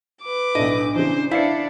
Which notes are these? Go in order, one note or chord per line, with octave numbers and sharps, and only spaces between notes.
B4 D6
B1 A2 D4 D#5
C#3 E3 C5
D4 E4 D5 F5 C7 C#7